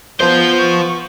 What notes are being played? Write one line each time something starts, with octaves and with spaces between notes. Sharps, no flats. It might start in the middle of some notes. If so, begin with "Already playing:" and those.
B3 F4 C5 G6
C#6